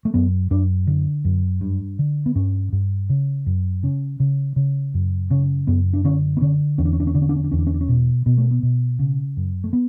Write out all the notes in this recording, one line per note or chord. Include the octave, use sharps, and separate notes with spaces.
A3
F#2 B3
F#2 D4
D3
F#2
G2
D3
B3
G2 C#4
G2
C#3
F#2
C#3 C#4
C#3
C#3
F#2
C#3 C#4
F#2 B3
D4
D3 C#4
B3
D3 C#4
E2 C#4
D4
C#4
D4
C#4
D3 D4
C#4
D4
C#4
D4
E2 C#4
D4
C#4
D4
C#4
B2
B2 B3
A3
B3
B2
C#3
F#2
A3
B3